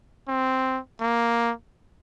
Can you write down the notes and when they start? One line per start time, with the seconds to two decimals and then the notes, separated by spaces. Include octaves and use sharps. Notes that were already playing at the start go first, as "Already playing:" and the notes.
0.28 C4
1.00 A#3